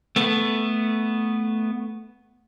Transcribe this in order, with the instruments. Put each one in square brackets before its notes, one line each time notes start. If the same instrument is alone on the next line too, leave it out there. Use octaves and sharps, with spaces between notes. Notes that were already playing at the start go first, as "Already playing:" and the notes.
[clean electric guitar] A3 B3